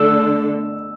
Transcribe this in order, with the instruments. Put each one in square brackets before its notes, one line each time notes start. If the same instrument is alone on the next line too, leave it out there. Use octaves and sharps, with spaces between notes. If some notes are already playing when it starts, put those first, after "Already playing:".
Already playing: [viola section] D3 A3 D4 A4 [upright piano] E6